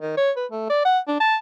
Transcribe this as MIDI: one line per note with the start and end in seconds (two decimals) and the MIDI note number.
0.01 0.17 51
0.17 0.31 73
0.36 0.46 71
0.52 0.66 57
0.69 0.81 74
0.85 0.99 78
1.07 1.16 62
1.20 1.36 81